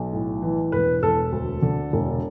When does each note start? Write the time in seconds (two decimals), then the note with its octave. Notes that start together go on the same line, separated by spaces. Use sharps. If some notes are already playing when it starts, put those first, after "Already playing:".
Already playing: B1
0.13 A2
0.42 E3
0.72 E1 B4
1.02 E1 A4
1.32 D2
1.62 D3
1.93 E1